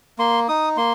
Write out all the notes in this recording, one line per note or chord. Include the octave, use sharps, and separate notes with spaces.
A#3 C6
D#4 D#6
A#3 C6